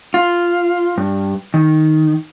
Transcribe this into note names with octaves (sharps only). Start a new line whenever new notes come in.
F4
G2
D#3